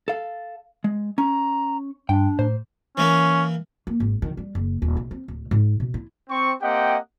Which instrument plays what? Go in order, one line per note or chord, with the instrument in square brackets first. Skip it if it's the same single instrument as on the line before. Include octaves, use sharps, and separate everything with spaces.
[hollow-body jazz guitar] A4 F5
G#3
[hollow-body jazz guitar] C#4 [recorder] A#5
[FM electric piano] G2 [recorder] D4 [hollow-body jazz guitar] G5
[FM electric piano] A2 [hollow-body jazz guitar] C5
[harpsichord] E3 A#3 [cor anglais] C#4
[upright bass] A#3
G#1
D#3
G3
F#1
D#1
B1
C4
D1
G#2
B2
E4
[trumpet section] C4 C#6
A#3 C4 G4 D#5 F#5 G5